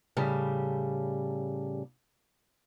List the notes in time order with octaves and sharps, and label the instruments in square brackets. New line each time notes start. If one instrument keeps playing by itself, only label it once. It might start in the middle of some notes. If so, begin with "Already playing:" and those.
[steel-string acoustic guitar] A2 C#3 G3